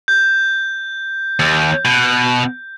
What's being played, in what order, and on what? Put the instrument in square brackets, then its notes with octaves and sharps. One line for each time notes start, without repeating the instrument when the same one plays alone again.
[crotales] G6
[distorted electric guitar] D#2
B2